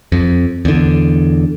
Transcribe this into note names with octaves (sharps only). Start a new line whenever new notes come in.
F2
E2 D3